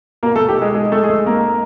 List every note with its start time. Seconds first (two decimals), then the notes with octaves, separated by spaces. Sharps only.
0.23 B2 A#3 A#4
0.36 A3 A4
0.49 B1 G4
0.62 G#3 G#4
0.75 G#3 G#4
0.92 A3 A4
1.01 B1 G#4
1.10 A3 A4
1.26 A#3 C4 A#4